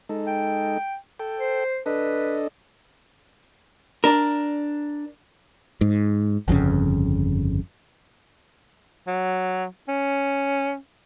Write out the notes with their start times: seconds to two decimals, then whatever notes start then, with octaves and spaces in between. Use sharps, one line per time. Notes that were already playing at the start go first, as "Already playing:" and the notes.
0.09 G#3 D#4 A4
0.27 G5
1.19 A4 G5
1.39 C5
1.86 D4 A4 B4 D#5
4.04 D4 A#4
5.81 G#2
6.48 G1 F2 G#2 C#3
9.07 F#3
9.88 C#4